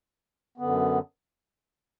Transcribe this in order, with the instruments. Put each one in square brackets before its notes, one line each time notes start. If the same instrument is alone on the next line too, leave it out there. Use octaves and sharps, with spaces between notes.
[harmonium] F#2 D3 B3